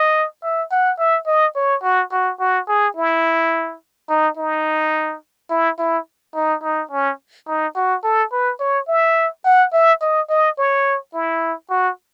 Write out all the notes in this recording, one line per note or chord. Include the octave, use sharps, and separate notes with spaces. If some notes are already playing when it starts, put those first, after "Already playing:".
Already playing: D#5
E5
F#5
E5
D#5
C#5
F#4
F#4
F#4
G#4
E4
D#4
D#4
E4
E4
D#4
D#4
C#4
D#4
F#4
A4
B4
C#5
E5
F#5
E5
D#5
D#5
C#5
E4
F#4